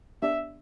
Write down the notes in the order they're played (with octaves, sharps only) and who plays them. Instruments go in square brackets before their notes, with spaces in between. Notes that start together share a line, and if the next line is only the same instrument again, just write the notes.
[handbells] B3 D4 G4 D5 [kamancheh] E5